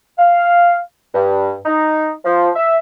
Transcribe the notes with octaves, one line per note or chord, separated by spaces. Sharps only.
F5
G2
D#4
F3
E5